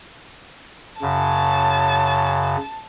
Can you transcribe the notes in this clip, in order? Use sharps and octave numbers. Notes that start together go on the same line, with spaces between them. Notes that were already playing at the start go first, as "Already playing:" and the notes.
F#2 C#3 A5